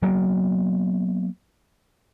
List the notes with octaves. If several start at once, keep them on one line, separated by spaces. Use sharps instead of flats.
F#3 A#3 B3